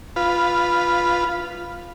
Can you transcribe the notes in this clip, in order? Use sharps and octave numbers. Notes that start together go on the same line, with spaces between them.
F4 B4